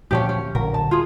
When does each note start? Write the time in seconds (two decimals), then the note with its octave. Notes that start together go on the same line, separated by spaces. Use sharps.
0.11 D2 A#2 F3 C#4 D4 G4
0.29 C#4
0.55 D1 A#1 D3 A#4
0.74 A5
0.91 F4 G#4